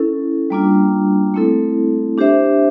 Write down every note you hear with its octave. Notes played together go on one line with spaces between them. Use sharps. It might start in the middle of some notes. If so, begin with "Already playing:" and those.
Already playing: C#4 E4 A4
G3 A#3 D4 F4
A3 C4 E4 A4
D4 G4 C5 E5